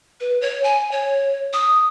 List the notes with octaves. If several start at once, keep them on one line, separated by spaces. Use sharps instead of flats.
B4
C#5
G#5
C#5
D#6